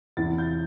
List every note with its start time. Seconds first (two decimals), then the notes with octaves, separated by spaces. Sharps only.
0.17 E2 C3 E3 A6
0.38 G6